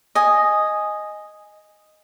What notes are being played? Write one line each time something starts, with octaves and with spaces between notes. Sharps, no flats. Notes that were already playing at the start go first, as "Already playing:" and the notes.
D#5 G#5